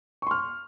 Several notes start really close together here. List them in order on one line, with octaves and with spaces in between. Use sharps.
C#6 C6 F6